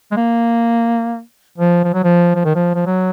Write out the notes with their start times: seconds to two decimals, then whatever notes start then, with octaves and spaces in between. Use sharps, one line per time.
0.11 G#3
0.17 A#3
1.58 F3
1.84 F3
1.94 F#3
2.04 F3
2.35 F3
2.44 D#3
2.55 F3
2.75 F3
2.86 F#3